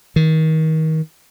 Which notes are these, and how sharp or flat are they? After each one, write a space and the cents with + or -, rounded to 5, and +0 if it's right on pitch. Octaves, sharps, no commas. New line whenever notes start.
D#3 +30